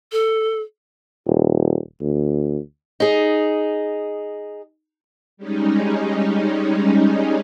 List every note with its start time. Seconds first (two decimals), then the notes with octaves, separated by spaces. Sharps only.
0.12 A4
1.27 D#1
2.01 D2
3.00 D#4 G#4
5.37 G3 G#3 C#4 D#4